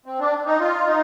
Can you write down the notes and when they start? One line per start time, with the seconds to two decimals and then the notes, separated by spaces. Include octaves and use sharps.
0.06 C4
0.20 D4
0.46 D#4
0.60 F4
0.87 D#4